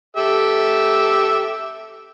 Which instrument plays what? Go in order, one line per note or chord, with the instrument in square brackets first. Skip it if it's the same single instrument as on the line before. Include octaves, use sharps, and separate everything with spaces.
[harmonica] G4 A4 E5